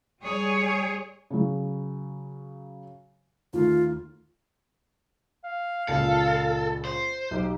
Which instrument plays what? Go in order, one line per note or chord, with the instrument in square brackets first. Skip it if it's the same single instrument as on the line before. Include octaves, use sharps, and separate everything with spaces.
[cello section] G3 G#4 C#5
[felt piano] C#3 F#3
[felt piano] D#2 A3 [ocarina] F4
[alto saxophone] F5
[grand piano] C#2 A#2 [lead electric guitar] A4
[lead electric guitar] C5
[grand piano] B1 [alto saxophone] G4